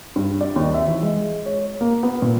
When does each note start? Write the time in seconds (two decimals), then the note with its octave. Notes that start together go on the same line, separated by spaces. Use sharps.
0.16 G2
0.41 D5
0.56 D#2
0.74 E5
0.87 E3
1.02 G#3
1.46 C#5
1.81 A#3
2.03 B3
2.22 A#2